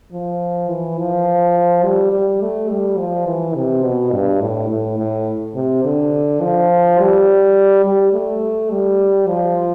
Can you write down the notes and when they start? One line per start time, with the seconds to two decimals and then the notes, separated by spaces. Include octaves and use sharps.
0.12 F3
0.69 E3
0.98 F3
1.83 G3
2.12 G3
2.42 A3
2.70 G3
2.99 F3
3.26 E3
3.56 C3
3.83 B2
4.12 G2
4.41 A2
4.70 A2
4.99 A2
5.55 C3
5.84 D3
6.41 F3
6.99 G3
7.85 G3
8.13 A3
8.70 G3
9.28 F3